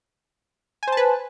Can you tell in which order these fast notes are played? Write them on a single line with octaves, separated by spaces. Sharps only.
G#5 C5 A5 B4